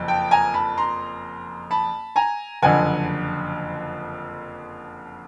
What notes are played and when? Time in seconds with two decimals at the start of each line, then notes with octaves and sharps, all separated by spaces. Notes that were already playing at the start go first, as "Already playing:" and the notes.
Already playing: F#1 F2
0.08 G5 A5
0.31 G#5 A#5
0.54 A5 B5
0.78 A#5 C6
1.71 A5 B5
2.16 G#5 A#5
2.62 F#1 F2 D3 F#5 G#5